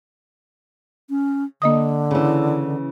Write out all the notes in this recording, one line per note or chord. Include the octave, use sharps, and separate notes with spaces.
C#4
D3 A#3 D#5 D#6
C#3 E3